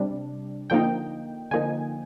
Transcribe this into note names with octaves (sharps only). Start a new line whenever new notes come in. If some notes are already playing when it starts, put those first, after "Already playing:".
Already playing: C3 G3 D4
D3 F3 A#3 D#4 G5
D3 F3 A#3 D#4 G#5